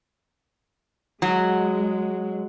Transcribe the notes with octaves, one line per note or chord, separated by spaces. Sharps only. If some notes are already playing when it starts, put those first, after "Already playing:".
F#3 G#3